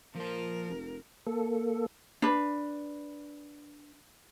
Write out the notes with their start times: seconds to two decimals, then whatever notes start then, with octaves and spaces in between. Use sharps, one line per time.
0.16 A#2 F3 A#4 C5
0.70 F1
1.27 A#3 A4
2.22 D4 B4